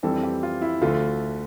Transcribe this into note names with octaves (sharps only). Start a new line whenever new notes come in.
F2 E3 G3 C4 A4
G4
F4
E4
D2 D3 F3 A3 F4